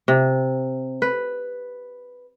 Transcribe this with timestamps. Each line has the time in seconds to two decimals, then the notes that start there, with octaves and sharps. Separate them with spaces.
0.08 C3
1.02 B4